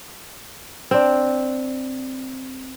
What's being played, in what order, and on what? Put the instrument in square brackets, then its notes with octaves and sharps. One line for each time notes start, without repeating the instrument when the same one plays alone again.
[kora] C4 D4